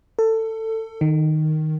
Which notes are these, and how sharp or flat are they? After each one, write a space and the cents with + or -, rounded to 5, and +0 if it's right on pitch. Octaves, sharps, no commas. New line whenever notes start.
A4 +20
D#3 -5